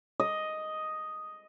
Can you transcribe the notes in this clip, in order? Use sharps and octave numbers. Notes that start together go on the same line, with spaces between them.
D#5